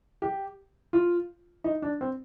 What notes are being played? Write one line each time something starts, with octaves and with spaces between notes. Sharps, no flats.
G4
F4
D#4
D4
C4